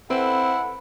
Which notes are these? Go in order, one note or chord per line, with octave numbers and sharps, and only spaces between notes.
C4 E4 A4 B4 F#5